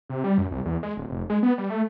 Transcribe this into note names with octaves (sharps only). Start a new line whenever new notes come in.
C3
G3
F#2
C2
E2
G#3
D1
F1
G#3
B3
G3
A3